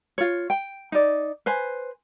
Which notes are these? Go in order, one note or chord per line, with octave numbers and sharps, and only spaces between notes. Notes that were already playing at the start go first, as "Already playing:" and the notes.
F4 C#5
G5
D#4 D5
B4 C5 G#5